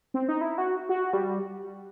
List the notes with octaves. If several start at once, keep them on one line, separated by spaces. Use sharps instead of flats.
C4
D#4
E4
F#4
F#4
G3